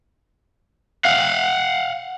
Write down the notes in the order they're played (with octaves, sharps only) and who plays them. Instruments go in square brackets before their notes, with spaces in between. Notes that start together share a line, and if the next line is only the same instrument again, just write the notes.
[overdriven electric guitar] F5 F#5